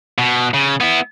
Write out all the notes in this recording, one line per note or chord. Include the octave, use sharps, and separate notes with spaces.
B2
C#3
B3 E4